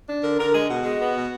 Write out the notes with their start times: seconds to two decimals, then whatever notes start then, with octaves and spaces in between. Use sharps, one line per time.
0.08 D4
0.23 D3 A#4
0.39 D3 A#4
0.54 G#3 G#4
0.69 B2 F#4
0.84 G#3
1.00 B3
1.16 B2